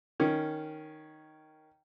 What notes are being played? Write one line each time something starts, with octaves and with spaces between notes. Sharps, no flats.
D#3 C#4